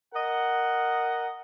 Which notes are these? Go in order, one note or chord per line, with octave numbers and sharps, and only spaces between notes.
A#4 D#5 F#5